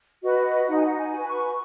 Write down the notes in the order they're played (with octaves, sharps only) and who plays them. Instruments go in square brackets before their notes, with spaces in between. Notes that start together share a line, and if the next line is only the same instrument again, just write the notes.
[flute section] F#4 B4 D#5
D#4 F#5
G#5
F#5
G#5
F#4 B4
C#6